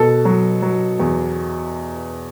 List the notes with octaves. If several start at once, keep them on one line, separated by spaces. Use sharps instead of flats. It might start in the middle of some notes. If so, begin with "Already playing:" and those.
Already playing: B2 A4
F#3
F#3
E2